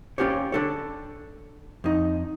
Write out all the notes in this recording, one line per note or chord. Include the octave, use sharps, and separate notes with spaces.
C#4 F4 G4 C5 C#5
D4 A4 C#5
F2 D#4